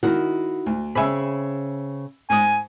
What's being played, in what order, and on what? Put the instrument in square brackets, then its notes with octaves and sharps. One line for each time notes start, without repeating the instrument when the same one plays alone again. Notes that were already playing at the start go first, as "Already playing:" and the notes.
[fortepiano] D#3 [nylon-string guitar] D#4 E4 F#4
[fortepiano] D2
[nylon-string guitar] C#3 C4 [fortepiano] E5 G#5 B5
[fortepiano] G#2 D#6 [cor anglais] G#5